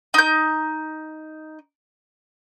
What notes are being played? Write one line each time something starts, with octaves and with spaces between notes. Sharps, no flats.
D#4 G6